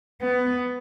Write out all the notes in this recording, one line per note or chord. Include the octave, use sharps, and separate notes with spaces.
B3